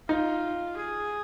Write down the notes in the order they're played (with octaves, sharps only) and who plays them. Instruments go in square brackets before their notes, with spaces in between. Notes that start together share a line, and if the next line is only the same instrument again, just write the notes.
[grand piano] D#4 [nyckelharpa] F4
[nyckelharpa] G#4